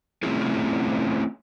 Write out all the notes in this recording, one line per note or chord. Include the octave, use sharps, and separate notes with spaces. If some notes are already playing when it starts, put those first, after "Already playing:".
A3 C4 C#4 E4 F4 G#4